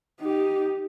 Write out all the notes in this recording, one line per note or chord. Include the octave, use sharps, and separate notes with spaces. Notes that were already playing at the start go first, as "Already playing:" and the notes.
D#4 G4